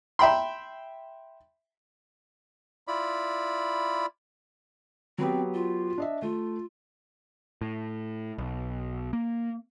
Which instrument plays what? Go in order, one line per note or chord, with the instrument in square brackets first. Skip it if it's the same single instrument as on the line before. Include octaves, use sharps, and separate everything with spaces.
[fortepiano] E5 G5 B5 C6
[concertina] E4 F4 D5 B5
[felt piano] F#3 B3 G4 [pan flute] C4
[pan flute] F4
[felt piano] D4 D#5 E5
[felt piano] A3 [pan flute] F4
[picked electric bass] A2
B1
A#3